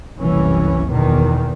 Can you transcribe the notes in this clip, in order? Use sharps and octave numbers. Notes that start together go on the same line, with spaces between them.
F#1 C2 E3 C#4
E2 B2 D#3